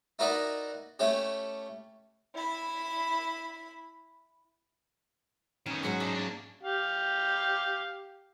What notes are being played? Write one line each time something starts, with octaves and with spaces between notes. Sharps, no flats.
D#4 E4 F#4 A#4 B4 D5
A3 C#4 E4 G4
E4 B5
D#3 B3 C#4
G#2 F#3 D#4 F#4
D4 D#4 E5
A#3 D4
G4 F5